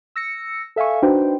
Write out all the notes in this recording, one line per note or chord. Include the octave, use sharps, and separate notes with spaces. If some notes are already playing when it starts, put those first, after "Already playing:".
E6 A#6 C#7
A4 E5 F5 G#5 C#6
D4 D#4 F#4 B4 C5 G5